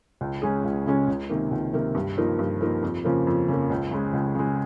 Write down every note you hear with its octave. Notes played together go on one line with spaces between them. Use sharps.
C#2
C#3 G#3 C#4 G#4
C#2
C#3 G#3 C#4 G#4
C#2
C3 D#3 A#3
C#2
C3 D#3 A#3
G2
F3 A#3 D#4
G2
F3 A#3 D#4
F2
C#3 F3 A#3
F2
C#3 F3 A#3
C#2
C#3 G#3
C#2
C#3 G#3